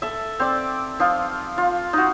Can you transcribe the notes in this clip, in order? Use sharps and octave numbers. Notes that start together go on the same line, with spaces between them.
A4 E5
C4 D5
F3 F4
F4
D#4 F#4